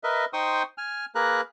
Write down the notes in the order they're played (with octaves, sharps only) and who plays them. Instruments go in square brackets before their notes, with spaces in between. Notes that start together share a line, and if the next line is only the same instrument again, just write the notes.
[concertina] A#4 B4 D#5 E5
D#4 C5 G5 C6 C#6 D#6
G#5 F6
A#3 G#4 A#4 B4 A#5 F#6